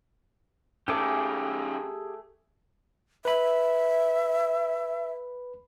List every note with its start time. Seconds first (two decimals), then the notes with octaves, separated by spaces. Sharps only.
0.88 D#3 A3 C#4 G4 G#4 G#5 D6
3.25 B4 E5 B5